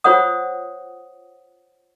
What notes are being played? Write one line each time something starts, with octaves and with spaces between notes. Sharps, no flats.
F4 C5 C#5 F#5 D#6